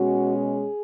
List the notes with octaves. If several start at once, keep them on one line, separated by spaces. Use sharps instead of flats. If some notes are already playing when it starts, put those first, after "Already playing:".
Already playing: B2 G#3 C#4 F#4
G#4